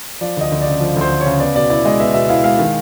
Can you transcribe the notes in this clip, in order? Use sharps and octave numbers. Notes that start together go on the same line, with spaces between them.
F3 D5
D2 D#5
D2
C#3 D5
F3
D2
C5
D2
C#5
C#3
B3 D5
B2 D5
E4 D5
G#3 D#5
B3 E5
B2 E5
E4 F5
G#3 F5
D#3